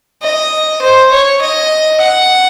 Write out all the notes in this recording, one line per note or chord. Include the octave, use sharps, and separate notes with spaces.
D#5
C5
C#5
D#5
F#5